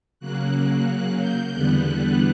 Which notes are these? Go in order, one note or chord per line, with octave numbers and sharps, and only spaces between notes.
C#3 F#3 A#3 F#6
G6
E2 D3 G3 B3 F#6
F#6